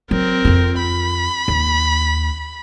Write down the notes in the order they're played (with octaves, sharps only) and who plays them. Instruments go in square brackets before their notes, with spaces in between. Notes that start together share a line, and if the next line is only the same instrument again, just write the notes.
[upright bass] F#3 [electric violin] C4 A#4
[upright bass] F2 F4
[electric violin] B5
[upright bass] D#2